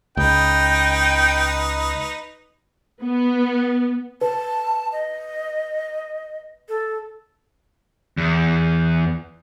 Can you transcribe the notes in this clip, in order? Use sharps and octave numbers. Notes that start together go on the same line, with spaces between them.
C#2 D#4 B4 G5
B3
B4 A5
D#5
A4
E2